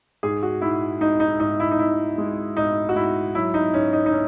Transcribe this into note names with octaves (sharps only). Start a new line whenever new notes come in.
G#2 G#4
F#4
G#2 E4
G#2 D#4
D#4
G#2 D#4
E4
D#4
G#2 E4
G#3
G#2 D#4
F#4
G#2 E4
F#3 E4
D#4
G#2 C#4
D#4
D#4
C#4